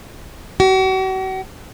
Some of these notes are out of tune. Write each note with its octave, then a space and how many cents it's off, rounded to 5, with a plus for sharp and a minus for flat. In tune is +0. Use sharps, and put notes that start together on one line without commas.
F#4 +40